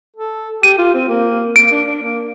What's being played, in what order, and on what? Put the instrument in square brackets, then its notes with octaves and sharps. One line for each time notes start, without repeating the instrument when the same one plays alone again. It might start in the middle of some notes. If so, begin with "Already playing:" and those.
[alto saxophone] A4
[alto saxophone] G4 [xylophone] D#7
[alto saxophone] F4
C4
A#3
[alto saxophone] A#3 [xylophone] D7
[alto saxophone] D4
D4
A#3